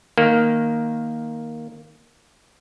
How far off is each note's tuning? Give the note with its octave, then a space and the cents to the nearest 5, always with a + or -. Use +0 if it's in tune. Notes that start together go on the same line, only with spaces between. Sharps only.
D#3 +0 A#3 +0